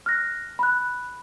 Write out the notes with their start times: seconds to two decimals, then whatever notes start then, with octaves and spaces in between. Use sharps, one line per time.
0.06 F6 F#6 A#6
0.59 B5 F#6